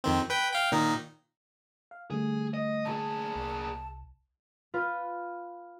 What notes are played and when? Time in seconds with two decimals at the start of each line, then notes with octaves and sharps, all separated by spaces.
0.04 F2 D#3 C4
0.30 B4 G5
0.52 F5 G5
0.72 A#2 D#3 D#4
1.91 F5
2.11 D3 G3 A3 G#4
2.54 D#5
2.85 A#2 G#4 A5
3.36 C2
4.74 F4 B4